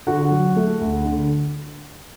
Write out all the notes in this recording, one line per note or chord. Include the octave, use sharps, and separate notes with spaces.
D3 F#4 F#5
F#3
A3
D2
D3